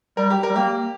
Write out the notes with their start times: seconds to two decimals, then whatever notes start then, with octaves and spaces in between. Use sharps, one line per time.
0.17 G3 A#4
0.30 G4
0.43 A#4
0.49 G3
0.56 A#3 G4